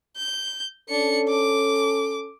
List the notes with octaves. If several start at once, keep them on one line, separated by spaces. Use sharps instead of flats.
G6
C#4 D4 A4 C#7
D6